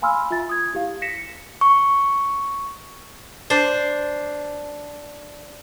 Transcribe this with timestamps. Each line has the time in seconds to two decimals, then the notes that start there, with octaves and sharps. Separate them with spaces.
0.02 F5 G#5 B5 C6 E6 F6
0.31 F4 E5 G#5 A6
0.49 D#6 G#6
0.73 E4 G4 F5
1.02 A#6 B6 C#7 E7
1.61 C#6
3.50 D4 C5